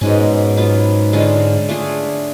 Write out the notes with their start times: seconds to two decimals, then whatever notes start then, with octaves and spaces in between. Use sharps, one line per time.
0.01 G#2 B2 G#3 C#4
0.57 F#3 B3 F4
1.13 D3 G#3 C#4 F4
1.69 A3 D4 F4 G#4